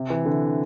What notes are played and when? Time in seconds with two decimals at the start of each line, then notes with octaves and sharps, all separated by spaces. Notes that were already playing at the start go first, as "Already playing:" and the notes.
Already playing: C3
0.10 E3
0.26 D3